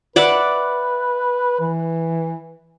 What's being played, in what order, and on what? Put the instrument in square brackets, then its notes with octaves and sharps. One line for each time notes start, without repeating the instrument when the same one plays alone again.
[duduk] B4 [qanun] D5 E5 F#5
[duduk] E3